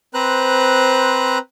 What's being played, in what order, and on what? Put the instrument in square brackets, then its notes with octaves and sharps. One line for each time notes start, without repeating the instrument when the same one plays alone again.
[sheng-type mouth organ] C4 B4 C5 A#5 F#6